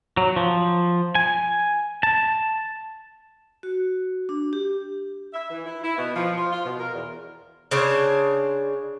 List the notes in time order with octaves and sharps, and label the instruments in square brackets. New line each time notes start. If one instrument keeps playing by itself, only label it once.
[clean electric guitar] F#3
F3
G#5
A5
[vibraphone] F#4
D4
G4
[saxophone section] E5
E3
E4
E4
B2
F3
F4
F4
B2
A#4
E2
[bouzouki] C#3 D4 C5 C#5